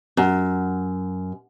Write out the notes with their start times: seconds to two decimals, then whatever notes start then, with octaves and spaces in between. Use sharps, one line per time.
0.17 F#2